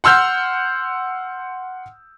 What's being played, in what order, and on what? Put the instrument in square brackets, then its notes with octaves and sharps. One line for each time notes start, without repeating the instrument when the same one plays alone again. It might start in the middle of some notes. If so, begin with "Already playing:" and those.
[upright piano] F#5 C6 E6 F6 G6